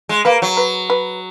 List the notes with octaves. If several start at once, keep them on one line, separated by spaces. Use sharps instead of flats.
G#3
A#3 B4
F#3
B4
B4